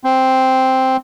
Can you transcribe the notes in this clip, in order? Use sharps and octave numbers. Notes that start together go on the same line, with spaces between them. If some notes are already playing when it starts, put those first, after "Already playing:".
C4